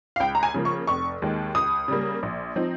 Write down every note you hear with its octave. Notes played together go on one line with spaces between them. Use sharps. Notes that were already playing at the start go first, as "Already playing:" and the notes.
F5
C#2 G5
A#5
G#5
C#3 F3 A#3
C#6
F1 C#6
D#2 D#3 G#3
C#2 D#6
C#3 G3 A#3
A#1
F3 C4 D#4